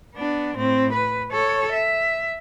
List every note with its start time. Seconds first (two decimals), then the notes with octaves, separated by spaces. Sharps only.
0.15 B3 D4
0.57 A2 C4
0.93 B4
1.32 A4 C#5
1.72 E5